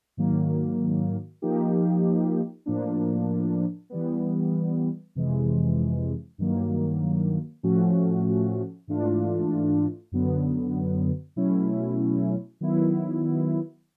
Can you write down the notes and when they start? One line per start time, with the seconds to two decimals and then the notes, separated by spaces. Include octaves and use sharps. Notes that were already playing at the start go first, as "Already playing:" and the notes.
0.17 G#2 D#3 F#3 A#3
1.42 F3 A#3 D#4 G4
2.66 A2 F3 A#3 D4
3.90 E3 G3 B3
5.15 F2 C3 E3 G#3
6.38 G2 D#3 F#3 A#3
7.63 A2 F3 A3 C#4 F#4
8.87 G#2 E3 A3 D4 F4
10.12 F#2 D3 F#3 B3
11.36 B2 F#3 A3 C#4 E4
12.61 D#3 F#3 B3 E4